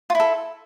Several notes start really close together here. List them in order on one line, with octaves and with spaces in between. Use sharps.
F4 E4 A4